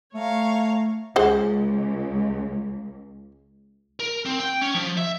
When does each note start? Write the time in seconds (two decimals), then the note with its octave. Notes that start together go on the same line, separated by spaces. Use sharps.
0.14 A3 C#5 F5 A#5
1.16 C#2 G#4 C5 F#5
4.00 A#4
4.25 C4
4.40 G5
4.61 C#4
4.74 F3
4.97 E5